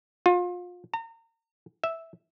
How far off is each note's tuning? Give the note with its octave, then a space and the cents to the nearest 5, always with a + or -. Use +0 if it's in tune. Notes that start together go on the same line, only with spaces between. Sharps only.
F4 +30
A#5 -35
E5 -5